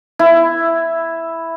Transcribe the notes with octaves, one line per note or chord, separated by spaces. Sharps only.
E4